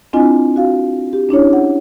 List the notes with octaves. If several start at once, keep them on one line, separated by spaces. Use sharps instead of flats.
C4 D4 E4 F4 D#5 G#5
F#4 F5
G4
C#4 D4 E4 C#5
F#5